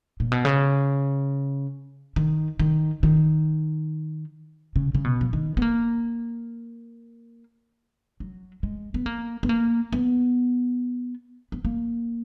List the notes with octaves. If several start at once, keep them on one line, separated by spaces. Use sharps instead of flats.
A#2
B2
C#3
D#3
D#3
D#3
C#3
C#3
B2
F3
D#3
B3
A#3
F#3
G#3
B3
A#3
B3
A#3
B3
B3
A#3